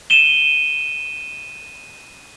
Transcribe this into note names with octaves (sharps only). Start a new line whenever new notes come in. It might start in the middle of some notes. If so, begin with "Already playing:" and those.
D#7 E7 G7